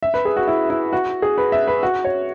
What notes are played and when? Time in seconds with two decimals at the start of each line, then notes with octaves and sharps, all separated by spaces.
0.03 E5
0.14 B4
0.25 G#4
0.36 F#4
0.48 E4
0.70 E4
0.93 F#4
1.22 G#4
1.38 B4
1.52 E5
1.68 B4
1.83 F#4
2.05 C#5